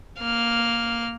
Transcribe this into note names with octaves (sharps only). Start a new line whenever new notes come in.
A#3 F6